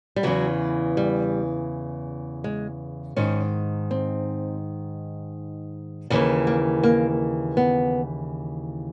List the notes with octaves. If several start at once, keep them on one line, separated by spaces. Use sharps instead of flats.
G3
E2 C#3 E3 F#3
G3
G#3
G#2 D#3 C#4
C4
D#2 C#3 E3
A#3
A#3
B3